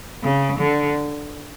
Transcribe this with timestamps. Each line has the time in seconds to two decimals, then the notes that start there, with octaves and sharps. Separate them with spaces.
0.22 C#3
0.60 D3